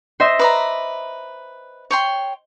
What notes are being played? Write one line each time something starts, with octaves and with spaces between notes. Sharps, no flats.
C5 D#5 E5
B4 D5 A#5
C#5 G5 C6